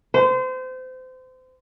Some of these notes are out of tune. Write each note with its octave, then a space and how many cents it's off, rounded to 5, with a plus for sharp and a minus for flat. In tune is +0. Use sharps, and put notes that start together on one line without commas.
C5 -30